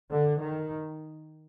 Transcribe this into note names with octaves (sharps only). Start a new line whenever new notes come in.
D3
D#3